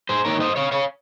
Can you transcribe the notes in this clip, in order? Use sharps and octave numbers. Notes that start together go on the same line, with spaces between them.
G#4 C5
G#2 D#3 A#3 A#4 C#5
C5 D#5
C#5 F5
C#5 F5